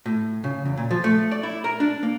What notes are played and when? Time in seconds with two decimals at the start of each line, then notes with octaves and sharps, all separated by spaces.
0.06 A2
0.44 C#3
0.65 E2
0.77 A#2
0.91 F3
1.04 A3
1.31 D5
1.43 E4
1.64 A#4
1.80 D4
2.03 A#3